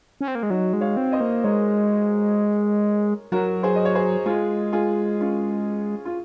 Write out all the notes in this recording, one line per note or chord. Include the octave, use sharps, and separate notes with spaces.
C#4
C4
A#3
G#3
F#3 D#4 F#4
G#3
C#5 F5
C4
C5 D#5
A#3
G#3 A#4 C#5
F#3 F#4 A#4
G#4 C5
D#5
C#5
G#4 C5
G#3 F4 G#4
F4 G#4
C#4 F4
F4